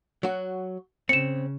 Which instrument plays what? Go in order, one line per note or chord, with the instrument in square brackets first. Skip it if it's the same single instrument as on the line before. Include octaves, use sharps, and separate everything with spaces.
[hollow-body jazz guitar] F#3 F#4
[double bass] C#3 [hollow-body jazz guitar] C4 [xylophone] C#7 E7